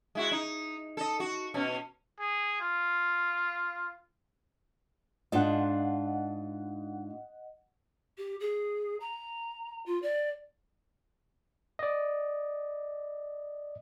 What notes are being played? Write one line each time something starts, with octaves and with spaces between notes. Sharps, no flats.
G#3 E4 F#4
D#4
A4 D#5
F#4
B2 C#4
G#4
F4
G#2 D4 F4 D#5 F#5
G4
G#4
A#5
F4
D5
D5 D#5